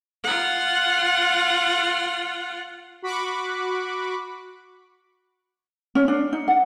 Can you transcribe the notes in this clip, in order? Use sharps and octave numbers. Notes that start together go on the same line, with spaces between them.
F4 F#5
F#4 B5 C#6 D6 F#6
C#4
D4
D#4
F#5